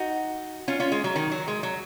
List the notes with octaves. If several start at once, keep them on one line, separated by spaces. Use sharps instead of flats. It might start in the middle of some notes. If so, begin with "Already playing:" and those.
Already playing: D#4 F#4
C#4 F4
C#4 F4
G#3
F#3
D#3
F#3
G#3
F#3